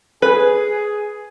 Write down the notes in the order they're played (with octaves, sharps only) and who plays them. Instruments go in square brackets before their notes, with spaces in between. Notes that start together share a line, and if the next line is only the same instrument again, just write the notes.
[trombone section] G#4 [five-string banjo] B4